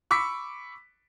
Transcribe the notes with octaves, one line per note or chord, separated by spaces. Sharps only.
B5 C#6 D6 E6 B6